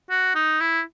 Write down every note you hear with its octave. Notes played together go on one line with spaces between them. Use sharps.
F#4
D#4
E4